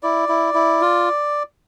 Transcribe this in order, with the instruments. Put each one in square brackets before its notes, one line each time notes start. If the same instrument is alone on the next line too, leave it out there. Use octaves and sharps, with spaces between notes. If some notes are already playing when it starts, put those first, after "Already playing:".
[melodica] E4 D5
E4
E4
F4